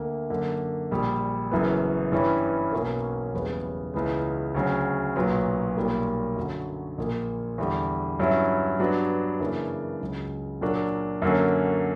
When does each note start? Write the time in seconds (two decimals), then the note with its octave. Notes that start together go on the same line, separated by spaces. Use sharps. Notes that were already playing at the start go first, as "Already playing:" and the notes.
Already playing: D2 D3 A#3
0.30 F#2 D3 A#3
0.91 A#1 A#2 G3
1.51 F#1 F#2 E3 B3
2.12 G2 E3 G3 C#4
2.72 B1 B2 F#3 A#3 C#4
3.33 F#1 E2 C#3 G3 B3
3.94 C#2 C#3 E3 B3
4.55 D2 C#3 F#3
5.16 B1 A#2 F#3 B3
5.77 B1 A#2 G3 A#3
6.36 F#2 D3 F#3
6.98 A#1 A#2 A#3
7.58 E2 D3 G3
8.20 G2 F#3 C#4 E4
8.79 G2 F#3 B3 D4 F#4
9.40 F#2 C#3 E3 A#3 D4
10.00 C#2 C#3 F#3
10.61 A#2 F#3 A#3 D4 F#4
11.22 F#2 D3 F#3 A#3 C#4